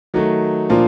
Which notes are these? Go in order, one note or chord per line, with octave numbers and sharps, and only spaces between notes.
D#3 F#3 A3
A#2 F3 A#3 D4 F4